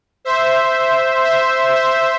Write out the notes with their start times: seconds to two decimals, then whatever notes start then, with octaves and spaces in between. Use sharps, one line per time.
0.25 C5 E5
1.24 C5 E5
1.75 C5 E5